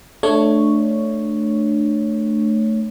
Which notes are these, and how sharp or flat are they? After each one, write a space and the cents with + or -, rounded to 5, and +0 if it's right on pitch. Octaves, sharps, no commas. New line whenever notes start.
A3 +0 D4 +20 C#5 +0